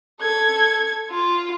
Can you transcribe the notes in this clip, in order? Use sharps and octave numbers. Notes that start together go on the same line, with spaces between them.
A4 G#6
F4